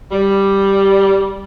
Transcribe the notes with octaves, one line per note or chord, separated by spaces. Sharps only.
G3